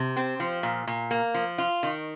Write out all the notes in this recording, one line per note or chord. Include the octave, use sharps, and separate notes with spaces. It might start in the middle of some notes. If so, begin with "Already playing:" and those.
Already playing: C3
C4
F3
A#2
A#2
A#3
F3
F4
D#3